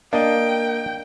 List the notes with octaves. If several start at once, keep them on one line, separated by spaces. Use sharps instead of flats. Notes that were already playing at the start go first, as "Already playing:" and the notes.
A#3 D4 D#5 G5